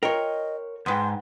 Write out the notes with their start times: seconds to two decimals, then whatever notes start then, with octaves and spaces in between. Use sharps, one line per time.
0.03 F4 A#4 C#5 D#5 G5
0.86 D#2 G#2 B3 B4 G5 C6